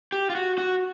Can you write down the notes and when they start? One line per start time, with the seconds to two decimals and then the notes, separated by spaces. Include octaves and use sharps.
0.12 G4
0.30 F4
0.35 F#4
0.58 F#4